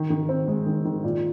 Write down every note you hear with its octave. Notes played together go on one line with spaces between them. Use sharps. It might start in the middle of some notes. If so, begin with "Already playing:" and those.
Already playing: D#3
D#3
C4
G#3
D#3
D#3
A#2